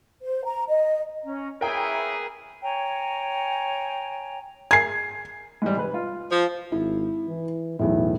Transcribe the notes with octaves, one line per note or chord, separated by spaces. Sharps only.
C5
A#5
D#5
C#4 A#5
A#3 B3 E4 G#4 A#4 C#5 E5 G5
C#5 G5 G#5 A#5
G#4 A#4 G#6 C7
G#2 E3 G3
F1 B4
F4
F3
G#1 E4
E3
B1 E2 A2 E4